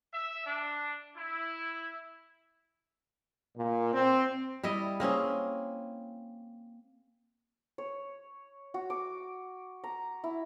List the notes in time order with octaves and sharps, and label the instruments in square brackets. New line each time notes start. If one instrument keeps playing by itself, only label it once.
[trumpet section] E5
D4
E4
[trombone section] A#2
C4
[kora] G3 E4 D5 D#5
A#3 C4 C#4 G#4
[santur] C#5
F#4
D6
A#5
E4